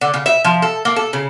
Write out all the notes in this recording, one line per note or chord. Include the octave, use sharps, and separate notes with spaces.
D3
C#3
E5
F3
A4
A#3
A4
C#3